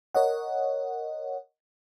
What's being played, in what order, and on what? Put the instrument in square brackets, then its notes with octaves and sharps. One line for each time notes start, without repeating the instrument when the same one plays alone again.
[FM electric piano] A#4 C#5 D#5 F#5